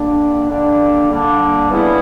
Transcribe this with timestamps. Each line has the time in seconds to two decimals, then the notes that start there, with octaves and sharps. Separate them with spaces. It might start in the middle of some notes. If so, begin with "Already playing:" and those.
Already playing: D3 G3 A#3 D4
0.48 D3 G3 A#3 D4
1.08 D3 G3 A#3 D4
1.69 C#3 E3 G3 B3 E4